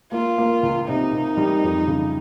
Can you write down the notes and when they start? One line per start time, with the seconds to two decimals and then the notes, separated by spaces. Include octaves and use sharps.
0.12 A#3 F4
0.38 A#3
0.63 C#2
0.88 C3 D#4
1.12 C3
1.37 G3
1.63 F2
1.88 C#3